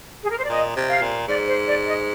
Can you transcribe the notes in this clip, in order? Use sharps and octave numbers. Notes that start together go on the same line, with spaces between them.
G#4
A#4
C5
D5
A#2 D#5
C3
F5
A#2
G#2 D5
C5
D5
D#5